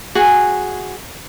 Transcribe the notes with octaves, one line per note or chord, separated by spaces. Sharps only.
F#4 G#4 G#5